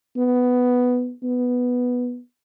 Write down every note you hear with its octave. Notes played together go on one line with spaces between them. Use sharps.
B3
B3